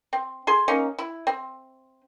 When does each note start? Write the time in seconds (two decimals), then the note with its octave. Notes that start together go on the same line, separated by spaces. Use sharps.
0.13 C4
0.47 G#4 C6
0.68 A#3 C#4 D#4
0.99 E4
1.27 C4